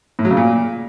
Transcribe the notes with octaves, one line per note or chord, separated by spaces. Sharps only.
A2
F#3
C#3
A#2